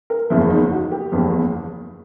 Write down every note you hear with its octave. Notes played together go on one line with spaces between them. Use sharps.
A#4
F#1 E2 C#3 F3 E4
D#4
F#4
G4
F#1 E2 C#3 F3